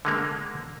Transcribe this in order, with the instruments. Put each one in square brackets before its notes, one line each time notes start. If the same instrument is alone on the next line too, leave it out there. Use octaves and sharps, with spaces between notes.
[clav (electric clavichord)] D3 G#3 A#3